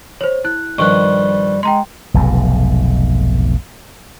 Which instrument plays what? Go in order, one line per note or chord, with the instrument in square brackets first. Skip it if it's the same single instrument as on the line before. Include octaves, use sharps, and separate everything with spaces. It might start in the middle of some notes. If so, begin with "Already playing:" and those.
[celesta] C5 C#5
E4 F#6
[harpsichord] G2 D#3 F3 [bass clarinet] G3 [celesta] C#6 F#6
[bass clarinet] G#3 [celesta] G5 A#5 C6
[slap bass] F1 B1 G#2